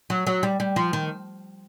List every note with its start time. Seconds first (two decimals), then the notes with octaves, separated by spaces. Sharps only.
0.10 F#3
0.27 F#3
0.43 G3
0.60 G3
0.76 F3
0.93 D#3